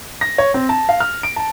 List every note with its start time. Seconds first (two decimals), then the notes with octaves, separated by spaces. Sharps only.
0.21 A#6
0.38 C#5
0.54 C4
0.69 A5
0.89 F5
1.00 F6
1.23 D7
1.36 A5